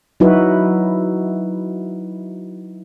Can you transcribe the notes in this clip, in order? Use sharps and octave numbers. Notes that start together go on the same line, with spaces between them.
F#3 D#4 E4 F#4 B4